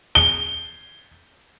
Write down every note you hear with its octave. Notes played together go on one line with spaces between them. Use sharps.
G7